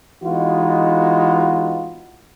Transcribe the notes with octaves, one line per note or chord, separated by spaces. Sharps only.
E3 G#3 B3 D#4 F4 F#4